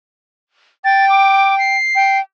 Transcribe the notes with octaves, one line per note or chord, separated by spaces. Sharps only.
G5 A6
D6
C7
G5